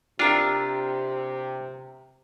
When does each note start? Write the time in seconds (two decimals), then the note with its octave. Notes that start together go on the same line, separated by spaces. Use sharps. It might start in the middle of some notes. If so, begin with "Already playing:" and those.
0.19 C3 D4 F4 G4 A#4 E5